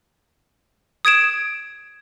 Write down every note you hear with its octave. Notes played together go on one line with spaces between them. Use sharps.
D#6 G#6 D7 E7